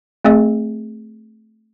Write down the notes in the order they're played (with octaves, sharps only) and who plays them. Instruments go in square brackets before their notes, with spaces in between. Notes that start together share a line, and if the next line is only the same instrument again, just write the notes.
[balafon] A3 C4 G#4 D#5